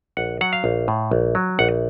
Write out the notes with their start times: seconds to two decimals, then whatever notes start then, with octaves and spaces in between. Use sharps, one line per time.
0.17 A#1 F#5
0.41 F#3 F#5
0.53 F5
0.64 A#1
0.88 A2
1.11 A#1
1.35 F#3
1.59 A#1 F#5